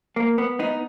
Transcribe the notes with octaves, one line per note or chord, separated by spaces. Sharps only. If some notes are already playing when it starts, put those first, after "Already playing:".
A#3
B3
B3 D#4